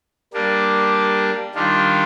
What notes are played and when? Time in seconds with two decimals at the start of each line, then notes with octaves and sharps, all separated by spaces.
0.33 G3 A#3 D4
1.54 D#3 G3 D4 F4